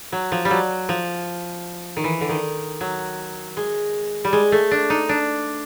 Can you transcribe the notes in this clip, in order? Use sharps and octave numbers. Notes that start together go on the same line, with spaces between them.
F#3
F3
G3
F#3
F3
D#3
E3
D3
D#3
F#3
G#3
G3
G#3
A3
D4
D#4
D4